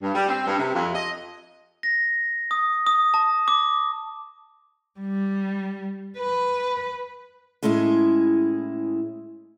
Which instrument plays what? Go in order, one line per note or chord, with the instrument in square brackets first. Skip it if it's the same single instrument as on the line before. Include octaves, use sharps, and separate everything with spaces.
[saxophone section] G2
G3
C4
G2
C3
F2
D#5
[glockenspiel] A#6
D#6
D#6
A5
D6
[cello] G3
B4
[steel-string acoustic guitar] A2 G#3 C#4 E4 G#4